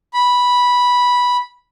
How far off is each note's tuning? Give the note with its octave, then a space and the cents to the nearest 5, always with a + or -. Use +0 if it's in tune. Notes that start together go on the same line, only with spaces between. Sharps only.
B5 -10